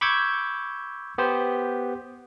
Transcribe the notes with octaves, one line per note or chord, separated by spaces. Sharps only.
B5 C#6 D6 E6 G6 G#6
B3 G4 C5